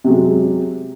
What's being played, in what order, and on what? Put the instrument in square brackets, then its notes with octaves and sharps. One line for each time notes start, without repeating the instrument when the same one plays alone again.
[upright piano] C3 F#3 G#3